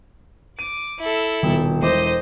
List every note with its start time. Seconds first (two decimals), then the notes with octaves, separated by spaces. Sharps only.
0.59 D6 D#7
0.99 E4 A4
1.43 D#1 B2
1.82 E1 E4 C5 D#5 D6